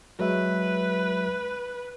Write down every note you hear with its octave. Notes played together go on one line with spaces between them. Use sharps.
F#3 G#3 B4 E5